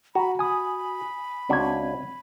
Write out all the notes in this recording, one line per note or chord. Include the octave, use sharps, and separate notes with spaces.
F#4 A#5 B5
G#5 B5 D#6
C#2 C4 D4 F#4 G#6